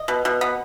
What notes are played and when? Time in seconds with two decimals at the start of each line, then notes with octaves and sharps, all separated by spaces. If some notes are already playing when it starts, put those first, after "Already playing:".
Already playing: D#5
0.08 B2
0.25 B2
0.41 B3